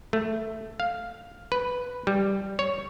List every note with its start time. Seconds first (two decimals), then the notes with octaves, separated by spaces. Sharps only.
0.13 A3
0.80 F5
1.52 B4
2.07 G3
2.59 C#5